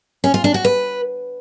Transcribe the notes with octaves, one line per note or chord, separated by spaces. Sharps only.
C#4
F4
D4
F#4
B4